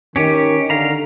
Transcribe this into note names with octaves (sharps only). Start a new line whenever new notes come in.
D#3 C#4 G4
D3 F5 A#5